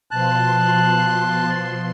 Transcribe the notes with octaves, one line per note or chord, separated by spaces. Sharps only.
B2 F3 A5 C6 F#6